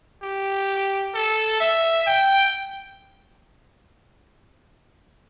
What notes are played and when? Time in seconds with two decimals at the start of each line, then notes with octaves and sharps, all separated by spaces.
0.23 G4
1.14 A4
1.60 E5
2.07 G5